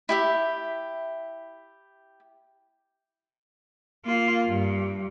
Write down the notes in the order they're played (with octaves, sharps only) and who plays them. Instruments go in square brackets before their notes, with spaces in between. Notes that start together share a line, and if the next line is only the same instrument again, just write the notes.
[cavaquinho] E4 G4 E5
[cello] A#3 F4
G2